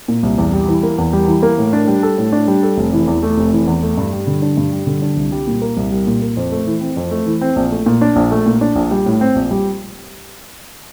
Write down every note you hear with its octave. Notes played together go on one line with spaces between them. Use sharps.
A#2
C2
E2
G3
E3
A#3
E2
G3
E3
A#3
A2
D4
G3
A4
A2
D4
G3
A4
F1
E3
E2
A3
F1
E3
E2
A3
G2
G3
D3
D4
G2
G3
D3
D4
C2
G3
A#2
A#3
C2
G3
A#2
A#3
F2
A3
E3
C4
F2
A3
E3
C4
A#1
A3
A#2
D4
A#1
A3
A#2
D4
A#1
G3
A2
C4
A#1
G3